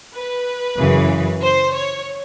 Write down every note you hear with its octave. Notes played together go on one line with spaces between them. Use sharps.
B4
F#2 C#3 E3
C5
C#5